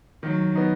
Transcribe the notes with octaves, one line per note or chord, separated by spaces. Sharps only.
D#3 F#3
B3 D#4